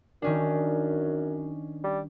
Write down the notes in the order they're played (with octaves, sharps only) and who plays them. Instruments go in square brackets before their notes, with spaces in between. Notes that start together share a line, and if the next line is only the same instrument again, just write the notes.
[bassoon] F#2 [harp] D#3 C#4 D4
[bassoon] G3